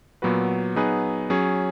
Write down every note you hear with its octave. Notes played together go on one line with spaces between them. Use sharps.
A#2 F#3 B3 F#4 B4
F#3 B3 D#4 G#4 B4
F#3 C#4 G#4 C#5